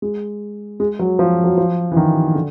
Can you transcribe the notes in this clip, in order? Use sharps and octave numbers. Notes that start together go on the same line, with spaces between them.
G#3
G#3
F#3
F3
F#3
F3
E3
D#3
D3